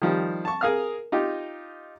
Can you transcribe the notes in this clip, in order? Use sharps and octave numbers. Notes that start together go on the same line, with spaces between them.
D#3 F3 G3
A5 C#6
G#4 A#4 F5 D#6 F6
D#4 F4 G4